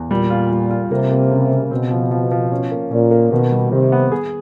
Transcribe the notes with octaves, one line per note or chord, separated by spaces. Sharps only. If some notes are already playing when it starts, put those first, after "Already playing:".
Already playing: E2
A#2 G3
F4
G3
F4
C3 A#3
A#3
C#3
C#3
B2 C4
F3
F3
F3
C#4
A#3
A#2 C#4
A#3
B2 D#3
G3
C3 D#3
B3
G#4